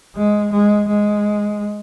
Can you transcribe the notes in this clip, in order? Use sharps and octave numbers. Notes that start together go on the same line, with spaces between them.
G#3
G#3
G#3